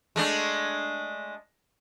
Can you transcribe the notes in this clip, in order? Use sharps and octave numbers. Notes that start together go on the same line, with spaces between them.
G#3 A3 D4